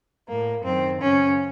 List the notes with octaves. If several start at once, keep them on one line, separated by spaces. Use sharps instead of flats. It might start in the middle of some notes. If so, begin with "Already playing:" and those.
A2 A#3
F#2 D#3 C4
F#2 C#3 C#4